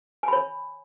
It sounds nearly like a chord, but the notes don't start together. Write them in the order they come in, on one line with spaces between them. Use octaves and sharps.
G#5 B5 C#5